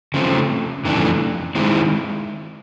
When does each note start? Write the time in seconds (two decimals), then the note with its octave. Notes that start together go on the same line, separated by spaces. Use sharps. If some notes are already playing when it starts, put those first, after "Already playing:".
0.14 C#3 F3 A3 C4
0.85 F2 C#3 E3 A3 D4
1.55 D#3 G#3 C4 E4